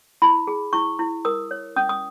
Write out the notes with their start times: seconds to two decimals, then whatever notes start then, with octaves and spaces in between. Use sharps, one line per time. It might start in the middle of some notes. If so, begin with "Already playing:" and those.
0.22 E4 B5
0.47 G#4
0.73 E4 C#6
0.99 E4
1.25 A#4 D#6
1.51 C#5
1.76 C#4 D#6
1.89 D#6